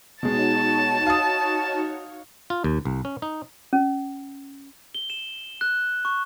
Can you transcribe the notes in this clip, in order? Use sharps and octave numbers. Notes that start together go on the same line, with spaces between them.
B2 G#3 D#4 F#4 C#5 A5
F5 D#6
F4
D#2
C2
C#4
D#4
C#4
G7
E7
F#6
C#6